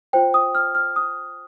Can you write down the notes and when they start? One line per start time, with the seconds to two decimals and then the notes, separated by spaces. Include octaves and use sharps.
0.13 F4 C5 G5
0.34 D#6
0.55 F6
0.75 F6
0.96 D#6